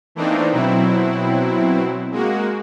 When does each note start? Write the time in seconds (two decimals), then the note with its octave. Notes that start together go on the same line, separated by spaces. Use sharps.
0.15 E3 A3 A#3 C4 D4 D#4
0.52 B2 F#3 C4 E4
2.12 G#3 A#3 F#4